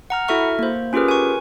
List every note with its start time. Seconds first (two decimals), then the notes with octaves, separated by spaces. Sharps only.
0.10 F#5 A#5 F6
0.28 E4 F#4 A4 E5 C#6 F6
0.59 A#3 C5
0.93 C#4 F4 G4 G#4 A#4 B4
1.08 G#5 C#6